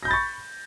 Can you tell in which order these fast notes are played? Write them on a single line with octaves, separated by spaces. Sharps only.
A#6 G6 B5 A6 C#6